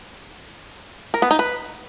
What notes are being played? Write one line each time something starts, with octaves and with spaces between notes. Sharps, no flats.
A#4
B3
D#4
B4